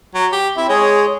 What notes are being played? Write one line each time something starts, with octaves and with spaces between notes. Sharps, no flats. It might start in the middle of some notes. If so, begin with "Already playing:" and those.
F#3
G4
C4 E4 E5
G#3 G#4 C#5